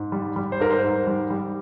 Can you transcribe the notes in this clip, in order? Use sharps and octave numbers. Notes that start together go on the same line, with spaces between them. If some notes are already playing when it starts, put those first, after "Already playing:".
Already playing: G#2
G3
G3
C5
G#2 A#4
C5
G#2
G3
G3